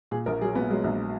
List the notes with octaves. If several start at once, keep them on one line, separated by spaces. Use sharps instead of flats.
A#2 G#4
A#1 A#4
F#3 G#4
A#2 B3
F#3 G#3
A#1